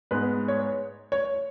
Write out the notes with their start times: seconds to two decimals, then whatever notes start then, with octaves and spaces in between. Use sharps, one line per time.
0.11 G#2 G#3 B3 B4
0.48 C#5
1.12 C#5